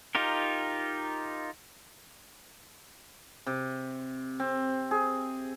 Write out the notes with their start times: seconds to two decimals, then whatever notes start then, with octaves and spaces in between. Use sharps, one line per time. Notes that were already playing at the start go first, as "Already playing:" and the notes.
0.15 D#4 F4 G4 A#4
3.47 C3
4.40 C4
4.91 G#4